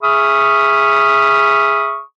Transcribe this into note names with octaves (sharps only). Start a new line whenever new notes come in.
G#4 E5 B5 C#6 D#6 F6